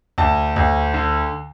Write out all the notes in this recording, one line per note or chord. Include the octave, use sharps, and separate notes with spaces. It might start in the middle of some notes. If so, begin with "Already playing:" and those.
D2 A5
D2
D3